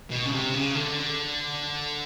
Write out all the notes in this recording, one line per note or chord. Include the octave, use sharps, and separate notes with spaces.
B2
C#3
C3
C#3
D3